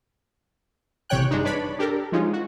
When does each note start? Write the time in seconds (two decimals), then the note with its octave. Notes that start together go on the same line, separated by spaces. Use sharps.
1.09 A1 C3 E3 C#5 G5 F#6
1.31 G2 G#3 D4 D#4
1.44 D4 B4 C#5 D5 B5
1.79 D4 G4 A4 A#4
2.12 F3 G#3 C#4 D#4 F4
2.33 F#4